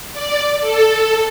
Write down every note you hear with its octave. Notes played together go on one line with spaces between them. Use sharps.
D5
A4